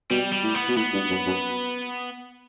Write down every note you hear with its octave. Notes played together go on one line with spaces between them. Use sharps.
B2 G3
G3
A2
B3
B2
A2 B3
G2
F#2
F#2